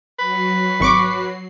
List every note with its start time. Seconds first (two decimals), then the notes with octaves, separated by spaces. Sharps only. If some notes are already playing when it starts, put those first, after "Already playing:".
0.19 F#3 F#4 B4 C7
0.80 G#1 C#6 D6